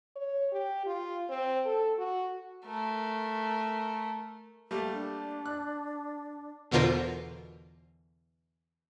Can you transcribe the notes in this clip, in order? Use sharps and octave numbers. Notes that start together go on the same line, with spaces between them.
C#5
G4
F4
C4
A4
F#4
A3 A#4
G3 A3 A#3
D4
F#6
E2 B2 D3 F4 A#4 C5